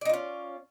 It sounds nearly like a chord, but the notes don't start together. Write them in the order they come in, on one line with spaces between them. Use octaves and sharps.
D5 D#4 F4 C#4